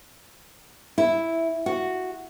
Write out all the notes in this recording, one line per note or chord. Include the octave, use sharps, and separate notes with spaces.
E4
F#4